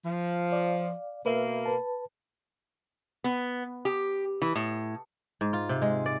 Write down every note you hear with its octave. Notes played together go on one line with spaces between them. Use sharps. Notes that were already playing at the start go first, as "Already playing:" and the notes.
F3
D5 F5
B2 A#3 B4 E5
B4 A5
B3
G4
E3
A2
G#2
F4
C3
G#3
D5